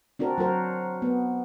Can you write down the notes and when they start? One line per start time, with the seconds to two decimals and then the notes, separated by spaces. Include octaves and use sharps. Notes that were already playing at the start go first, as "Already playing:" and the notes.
0.19 C4 D4 F#4 A#4
0.38 F#3 F#4 A#4 C5
1.02 B3